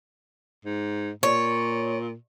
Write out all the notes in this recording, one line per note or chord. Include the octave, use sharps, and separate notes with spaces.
G#2
A#2 C#5